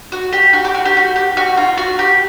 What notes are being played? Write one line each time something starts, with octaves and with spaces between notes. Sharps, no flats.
F#4
G4
F#4
G4
F#4
G4
F#4
G4
F#4
F4
F#4
G4